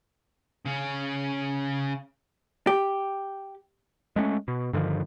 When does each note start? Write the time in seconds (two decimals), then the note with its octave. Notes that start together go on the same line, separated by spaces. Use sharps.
0.66 C#3 C#4
2.67 G4
4.16 G#3 A3 C4 C#4
4.48 B2
4.73 G2 D3 D#3 F3